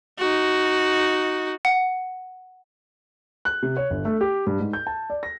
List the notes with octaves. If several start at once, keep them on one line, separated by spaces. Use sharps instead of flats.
D#4 F#4
F#5
F#6
C3
C#5
G1
A3
G4
G2
G#2
G6
A5
D5
A#6